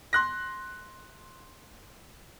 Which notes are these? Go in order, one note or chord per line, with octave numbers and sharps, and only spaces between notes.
C6 F#6 A#6